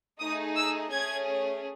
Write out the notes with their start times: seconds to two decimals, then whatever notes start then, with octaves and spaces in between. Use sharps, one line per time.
0.19 A3 D#4 G#4 D#6
0.56 E6
0.91 A3 C#4 G#4 G#6